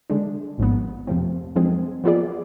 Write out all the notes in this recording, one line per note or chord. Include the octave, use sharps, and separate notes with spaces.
D3 G#3 D4
G#1 G#2 F3 B3
F2 C3 F3 A3 C4
F3 G#3 C4 G#4
F3 B3 F4 G#4 D5